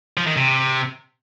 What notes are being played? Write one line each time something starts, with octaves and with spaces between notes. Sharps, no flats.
F3
D#3
C3